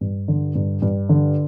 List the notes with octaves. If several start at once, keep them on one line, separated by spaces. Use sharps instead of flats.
G2
D3
G2
G2
D3